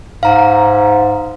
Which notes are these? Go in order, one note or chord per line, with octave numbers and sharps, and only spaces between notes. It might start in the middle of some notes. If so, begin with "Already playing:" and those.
G#2 F5 A#5